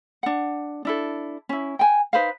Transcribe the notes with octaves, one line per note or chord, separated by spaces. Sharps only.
D4 F#5
D4 E4 A4
C#4 E4
G5 G#5
D#4 B4 C5 F5